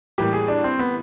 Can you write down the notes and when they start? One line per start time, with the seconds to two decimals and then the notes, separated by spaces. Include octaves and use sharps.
0.18 A2 E3 G3 A#3 G4
0.33 G#4
0.48 D4
0.64 C4
0.79 B3